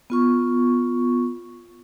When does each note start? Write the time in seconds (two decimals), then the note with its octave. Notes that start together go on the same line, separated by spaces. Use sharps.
0.10 B3 F4 C#6